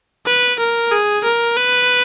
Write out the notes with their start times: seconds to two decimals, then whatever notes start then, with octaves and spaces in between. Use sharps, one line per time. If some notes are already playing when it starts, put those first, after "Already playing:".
0.26 B4
0.59 A#4
0.91 G#4
1.24 A#4
1.57 B4